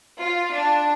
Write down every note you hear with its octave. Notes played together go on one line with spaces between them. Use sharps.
F4
D4